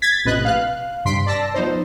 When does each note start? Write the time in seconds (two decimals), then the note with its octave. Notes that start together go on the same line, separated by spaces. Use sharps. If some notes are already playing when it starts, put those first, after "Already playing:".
0.02 G#6 A6 B6
0.25 A#1 A2 C3 B4 D#5 F#6
0.45 F5 F#6
1.05 G2 C3 C6 B6 C7 D7
1.26 D5 A5 E6 A#6
1.54 F3 B3 D#4 C5